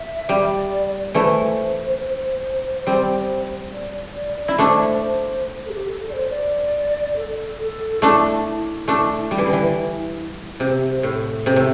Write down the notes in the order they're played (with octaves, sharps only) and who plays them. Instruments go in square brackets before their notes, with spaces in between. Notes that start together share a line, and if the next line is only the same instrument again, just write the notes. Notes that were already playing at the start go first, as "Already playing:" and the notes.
Already playing: [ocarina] E5
[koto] G3 [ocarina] D5
[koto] E3 A3 [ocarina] C5
[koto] G3 C4
[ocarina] D5
D5
D5
D5
[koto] E4
[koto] A3 D4 [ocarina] C5 D5
[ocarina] C5
A4
G4
A4
D5
C5
D5
A4
A4
[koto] A3 D4 [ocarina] E4
[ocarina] E4
[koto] A3 D4
G3
E3
D3
E3
[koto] C3 [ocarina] G4
[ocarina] C5
[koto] A2 [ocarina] A4
[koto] C3
A2